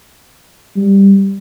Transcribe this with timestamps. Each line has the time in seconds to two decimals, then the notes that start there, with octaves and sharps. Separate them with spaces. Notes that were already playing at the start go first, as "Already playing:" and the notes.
0.76 G3